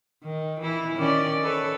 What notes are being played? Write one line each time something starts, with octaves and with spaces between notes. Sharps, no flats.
D#3
E3 E4
D#3 C#4 D5
A4 B4 C#5